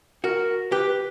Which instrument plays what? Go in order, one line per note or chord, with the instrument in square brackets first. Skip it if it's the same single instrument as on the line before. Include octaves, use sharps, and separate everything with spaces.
[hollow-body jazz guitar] F#4 [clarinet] A#4
[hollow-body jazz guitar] G4 [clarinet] B4
[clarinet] B4